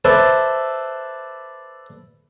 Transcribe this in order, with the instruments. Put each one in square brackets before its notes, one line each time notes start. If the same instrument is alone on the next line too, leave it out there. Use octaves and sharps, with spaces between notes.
[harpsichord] A4 B4 C5 D5 E5